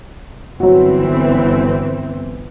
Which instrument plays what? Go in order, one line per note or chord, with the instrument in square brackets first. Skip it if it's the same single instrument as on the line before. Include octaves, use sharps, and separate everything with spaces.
[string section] G1 E3 C4 [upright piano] F#3 F#4